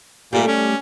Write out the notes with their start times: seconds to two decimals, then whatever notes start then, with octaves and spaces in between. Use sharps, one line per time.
0.33 A#2 G3 A3
0.47 C#4